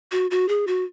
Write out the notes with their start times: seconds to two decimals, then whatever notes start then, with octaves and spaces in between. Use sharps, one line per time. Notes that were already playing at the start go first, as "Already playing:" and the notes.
0.12 F#4
0.31 F#4
0.49 G#4
0.67 F#4